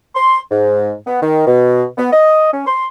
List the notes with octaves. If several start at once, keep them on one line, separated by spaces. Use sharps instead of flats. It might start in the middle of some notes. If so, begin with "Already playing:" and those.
C6
G#2
B3
D#3
B2
B3
D#5
C#4
C6